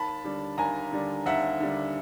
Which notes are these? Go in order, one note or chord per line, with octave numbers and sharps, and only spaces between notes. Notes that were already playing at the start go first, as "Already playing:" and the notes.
Already playing: D#2 A5 B5
D3 G3
D#2 G#5 A#5
D3 G3
D#2 E5 F#5
D3 G3